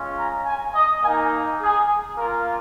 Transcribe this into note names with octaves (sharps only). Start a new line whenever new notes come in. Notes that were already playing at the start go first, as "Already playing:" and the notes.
Already playing: G#3 C#4 F4
A#5
G#5
D#5
A#3 D#4 G#5
G#4
A#3 F4 A#4